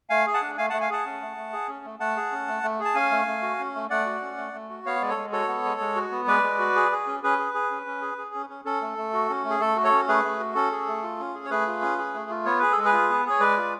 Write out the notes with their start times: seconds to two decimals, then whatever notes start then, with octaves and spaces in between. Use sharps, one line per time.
0.10 A3 F5 G#5
0.27 G#4
0.34 F#5 A5
0.42 D4
0.57 A3 F5 G#5
0.69 A3 F#5 A5
0.81 F5 G#5
0.90 G#4 F#5 A5
1.06 C#4
1.22 A3
1.37 A3
1.53 G#4
1.68 C#4
1.85 A3
2.00 A3 F#5 A5
2.17 G#4
2.32 C#4
2.48 A3
2.63 A3
2.80 G#4
2.85 A5
2.95 C#4 F5 G#5
3.11 A3
3.27 A3
3.42 F#4
3.59 C#4
3.75 A3
3.90 A3 D5 F#5
4.06 F#4
4.21 C#4
4.37 A3
4.54 A3
4.69 F#4
4.85 B3 C#5 F5
5.02 G#3 D5
5.09 A4 C#5
5.17 G#3
5.32 F#4 A4 C#5
5.48 B3
5.65 G#3
5.80 G#3
5.96 F#4
6.11 B3
6.27 G#3 B4 D5
6.43 G#3
6.59 F#4
6.75 G#4
6.92 G#4
7.07 C#4
7.23 C#4 G#4 B4
7.38 G#4
7.54 G#4
7.71 C#4
7.87 C#4
8.02 G#4
8.18 G#4
8.34 C#4
8.49 C#4
8.65 C#4 A4
8.82 A3
8.98 A3
9.13 F#4
9.29 C#4
9.44 A3
9.50 G#4
9.60 A3 A4
9.76 F#4
9.84 A4 C#5
9.92 C#4
10.08 A3 G#4 B4
10.24 A3
10.40 F#4
10.55 C#4 A4
10.72 G#4
10.88 A3
11.03 F4
11.20 C#4
11.34 G#4
11.45 C#5
11.50 A3 G#4 B4
11.67 F4
11.82 C#4
11.98 G#4
12.14 A3
12.30 F4
12.45 B3 C#5
12.59 G#4 B4
12.72 A4
12.78 G#3
12.85 G#4 B4
12.93 F4
13.10 B3
13.25 G#4 C#5
13.40 G#3 B4 D5
13.57 F4